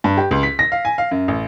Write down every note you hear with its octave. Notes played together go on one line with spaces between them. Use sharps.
G2
G4
C#2
B6
A#6
F5
G#5
F5
F#2
A1